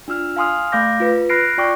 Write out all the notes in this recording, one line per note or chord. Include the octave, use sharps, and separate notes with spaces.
D4 F4 E6 F6
F5 G#5 C6 D#6 F6
A3 F5 D6 G6 A#6
F4 B4
B5 F6 F#6 A#6 C7 D7
F4 D5 G5 C#6 D6